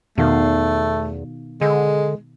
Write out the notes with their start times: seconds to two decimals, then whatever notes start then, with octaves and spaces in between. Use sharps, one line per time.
0.18 E2 B2 D#3 A3 F5
1.61 D3 G#3